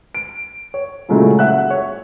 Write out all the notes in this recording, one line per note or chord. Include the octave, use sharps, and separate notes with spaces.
D7
C#5
A#2 C#3 F#3 G#3 A3 E4
E5 F#5 F#6
C#5